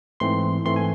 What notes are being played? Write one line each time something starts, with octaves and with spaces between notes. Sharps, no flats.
G#2 E3 A3 C4 C6
G#2 E3 A3 C4 C6
G#5